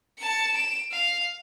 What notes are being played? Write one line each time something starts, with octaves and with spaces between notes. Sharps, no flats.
A5 C#7
D7 E7
F5